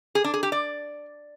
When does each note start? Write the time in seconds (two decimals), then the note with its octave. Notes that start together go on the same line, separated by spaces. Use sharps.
0.15 G#4
0.24 D4
0.34 G#4
0.43 G4
0.52 D5